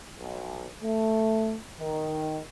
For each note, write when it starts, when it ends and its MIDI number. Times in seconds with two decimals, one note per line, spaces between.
0.18 0.67 35
0.82 1.56 57
1.79 2.40 51